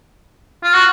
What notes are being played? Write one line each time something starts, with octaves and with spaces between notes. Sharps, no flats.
F4
F#4